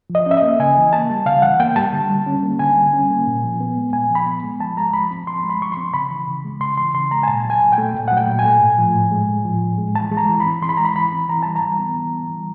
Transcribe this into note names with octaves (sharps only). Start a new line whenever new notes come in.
F3
D#5
C#4 E5
D#5
A#3
C#3 G#5
E3
A#3 A5
G3
C#3 F5
E3 F#5
A#3 G5
G3 A5
D3
G3
C#4
A#3
D3 G#5
G3
C#4
A#3
A#2
F3
B3
G#3
A#2 G#5
F3
B5
B3
G#3
F3 A5
G#3 A#5
F3 B5
C4
F3 C6
G#3
B5
F3 C#6
C4 C6
C#3 B5
E3
C#3
G#3
C#3 C6
E3 C6
C#3 C6
G#3 A#5
G#5
A#2 A5
F#3
G#5
A#2
G5
A3
A#2
F#3 F#5
G5
A#2
G#5
A3
A2
F3
A2
G#3
A2
F3
A2
G#3
E3 A5
G#3
A#5
E3
B5
C4
E3 C6
B5
G#3 A#5
B5
E3 B5
C4
E3 A#5
G3 A5
A#5
E3
B3
E3
G3
E3